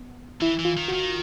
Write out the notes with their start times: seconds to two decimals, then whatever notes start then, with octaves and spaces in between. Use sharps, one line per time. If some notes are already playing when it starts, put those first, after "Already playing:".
Already playing: B3
0.41 E3 E4
0.59 E3
0.65 F4
0.77 D#3
0.88 F#4
0.94 D#3